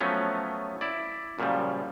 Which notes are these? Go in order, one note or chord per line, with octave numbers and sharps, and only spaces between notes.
F3 F#3 A3 B3 C#4
E4 D5
F#2 A#2 C#3 F3 G3